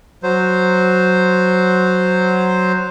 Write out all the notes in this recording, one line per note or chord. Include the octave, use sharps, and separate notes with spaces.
F#3 C5